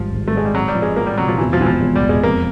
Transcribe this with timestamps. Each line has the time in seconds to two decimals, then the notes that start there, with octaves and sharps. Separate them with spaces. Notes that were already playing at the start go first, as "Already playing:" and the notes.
Already playing: G#1 F3 G3
0.12 G#1
0.28 A3
0.33 G#2 G#3
0.45 G3
0.54 F#3 C4
0.68 G3
0.75 F3
0.82 G#3
0.96 F3 A#3
1.07 G3
1.18 C3 F#3
1.28 F3
1.38 E2 E3
1.53 F3
1.60 E1 E3
1.66 F3
1.81 E2
1.96 G3
2.02 E1
2.09 G#3
2.23 F2 A#3